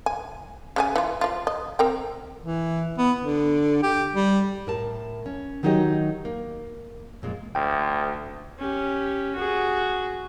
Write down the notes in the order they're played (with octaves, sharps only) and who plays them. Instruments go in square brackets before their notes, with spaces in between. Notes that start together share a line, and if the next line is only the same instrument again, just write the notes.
[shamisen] G#5
C#3 D4 G#5
E3 F4
F3 F4
D#5
C4 A#4 G5
[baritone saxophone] E3
B3
D3
G4
G3
[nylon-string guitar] A2 A#4 A5
C#4
D#3 F#3 D#4 F#4 G4 D#5
A#3
F2 A#2 G#3
[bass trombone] D2 [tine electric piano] G5
[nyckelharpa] C#4 G4
F#4 G#4